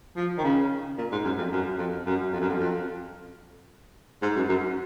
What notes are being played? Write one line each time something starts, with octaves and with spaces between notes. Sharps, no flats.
F3
D#3
C#3
A#2
G#2
F#2
F2
F#2
F2
F#2
F2
F#2
F2
F2
G#2
F#2
F#2